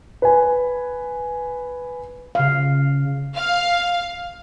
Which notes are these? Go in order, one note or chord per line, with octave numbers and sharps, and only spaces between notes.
B4 G#5
C#3 F5
F5